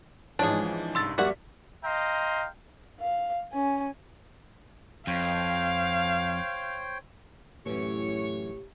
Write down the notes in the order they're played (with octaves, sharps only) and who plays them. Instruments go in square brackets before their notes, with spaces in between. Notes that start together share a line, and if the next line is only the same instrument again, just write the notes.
[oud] G#2 C#4 [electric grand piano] E3 F3 [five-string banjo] D4 G#4 [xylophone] A5
[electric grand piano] C2 G2 [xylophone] C6 E6 A6
[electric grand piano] F2 E5 B6 [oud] G3 A#3 [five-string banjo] F#4 F#5
[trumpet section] D#5 F5 G5 A#5 C6
[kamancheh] F5
C#4 G#5
[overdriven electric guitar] F2 [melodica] C5 C#5 G5 [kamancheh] F5
[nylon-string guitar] F#2 E3 [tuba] A2 [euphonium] G4 [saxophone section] C#5